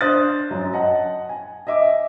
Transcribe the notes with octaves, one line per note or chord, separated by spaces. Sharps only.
D4 C5 D#6 F#6 A6
F#2 F#3
D#5 F#5 A5
G#5
D#5 E5 D6